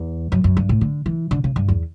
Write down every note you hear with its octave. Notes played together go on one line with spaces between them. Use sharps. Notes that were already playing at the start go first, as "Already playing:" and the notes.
Already playing: E2
F#2
F#2
G2
A2
D3
E3
D3
C#3
G2
E2